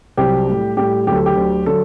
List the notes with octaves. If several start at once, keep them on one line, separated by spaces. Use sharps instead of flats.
C2 C3 F#3 G4
A2 G3
A2 G3 G4
D2 D3 F#3 G4
A4
G4
D2 D3 F#3
D3 F#3 A4